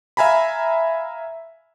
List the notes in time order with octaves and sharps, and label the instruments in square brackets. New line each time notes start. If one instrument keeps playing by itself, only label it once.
[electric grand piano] E5 F5 G#5 A#5 B5